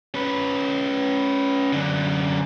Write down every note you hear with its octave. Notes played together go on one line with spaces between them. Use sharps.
C#4 B4
F#2 D3